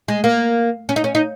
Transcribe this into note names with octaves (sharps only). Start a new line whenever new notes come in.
G#3
A#3
C#4
D#4
C#4
D#4